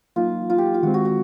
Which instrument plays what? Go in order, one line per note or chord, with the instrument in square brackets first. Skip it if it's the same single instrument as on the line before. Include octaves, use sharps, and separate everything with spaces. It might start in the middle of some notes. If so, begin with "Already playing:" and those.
[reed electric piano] F#3 A#3 D#4 [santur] F4
[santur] F4
G4
F4
[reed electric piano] D#3 G#3 C4 [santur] F#4
[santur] F#4
F#4